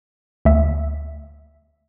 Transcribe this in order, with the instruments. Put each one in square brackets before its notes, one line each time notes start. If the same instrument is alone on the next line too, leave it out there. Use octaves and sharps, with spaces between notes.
[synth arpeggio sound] D2 E5